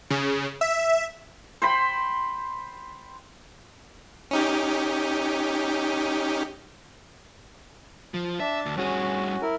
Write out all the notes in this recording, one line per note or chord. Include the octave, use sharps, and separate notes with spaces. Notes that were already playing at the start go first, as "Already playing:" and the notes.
C#3
E5
C5 G5 B5 C6
C#4 D#4 G4
F3
D4 E5 A5
D2
G2 C#4 F#4 G#4
E4 A#4